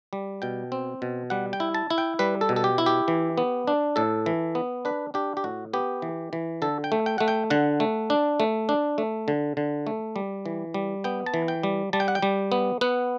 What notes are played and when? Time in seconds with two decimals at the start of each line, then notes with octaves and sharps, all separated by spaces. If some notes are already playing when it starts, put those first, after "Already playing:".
0.13 G3
0.42 B2 G5
0.72 C4
1.02 B2
1.30 G3 F#5
1.53 G5
1.60 E4
1.74 A5
1.90 E4
1.98 G5
2.19 G3 B4
2.41 A4
2.49 B2
2.56 A4
2.64 G4
2.78 E4
2.86 G4
3.08 E3
3.38 B3
3.67 D4
3.96 A2 A4
4.26 E3
4.55 B3
4.85 D4 B4
5.14 D4 G4
5.37 G4
5.44 A2 F#4
5.73 B3 G4
6.02 E3
6.33 E3
6.62 D3 A4
6.84 G5
6.92 A3
7.06 G5
7.18 A3 F#5
7.28 G5
7.50 D3 F#5
7.80 A3
8.10 D4
8.40 A3
8.69 D4
8.98 A3
9.28 D3
9.57 D3
9.87 A3
10.16 G3
10.46 E3
10.74 G3
11.04 B3 G5
11.26 A5
11.34 E3
11.48 G5
11.63 G3
11.93 G3 A5
12.00 G5
12.08 F#5
12.15 G5
12.22 G3
12.52 B3
12.81 B3 F#5